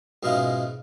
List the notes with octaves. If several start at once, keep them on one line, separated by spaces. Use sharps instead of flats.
G#2 B2 G#3 C#4 E4 F4